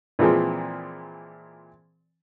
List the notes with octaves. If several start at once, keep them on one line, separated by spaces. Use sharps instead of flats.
A#2 E3 F3 G#3 C4